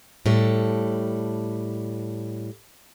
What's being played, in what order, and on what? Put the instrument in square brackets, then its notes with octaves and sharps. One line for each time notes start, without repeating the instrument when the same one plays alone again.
[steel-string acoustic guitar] A2 G3 A4